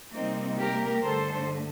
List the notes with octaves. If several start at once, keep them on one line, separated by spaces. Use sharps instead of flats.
C3 G3 A#3 C4 D#4
G4 A#4
G2 D3 A3 A4 C5